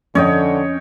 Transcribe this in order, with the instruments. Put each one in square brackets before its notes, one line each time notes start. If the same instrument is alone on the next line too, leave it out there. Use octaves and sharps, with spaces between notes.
[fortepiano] F2 [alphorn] D3 [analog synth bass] C#4 [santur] C#5 D#5 G5